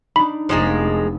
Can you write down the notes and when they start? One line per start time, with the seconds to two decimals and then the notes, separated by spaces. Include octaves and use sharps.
0.16 D4 D#4 B5
0.49 F1 F3 G#3 A#3